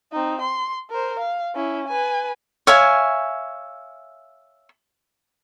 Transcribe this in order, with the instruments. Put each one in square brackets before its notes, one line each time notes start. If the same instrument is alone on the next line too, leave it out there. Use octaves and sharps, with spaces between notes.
[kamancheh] C4 D#4
C6
A#4 C5
F5
C#4 E4
B4 G#5
[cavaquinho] C#5 E5 F5 G#5